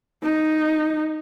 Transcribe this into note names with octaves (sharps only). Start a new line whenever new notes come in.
D#4